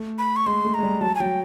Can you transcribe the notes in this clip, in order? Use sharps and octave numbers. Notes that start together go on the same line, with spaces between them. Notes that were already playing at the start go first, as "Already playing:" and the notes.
Already playing: A3
B5
C#6
G#3 C6
A3
G#3 A#5
G3
F#3 A5
G#5
F#3 G5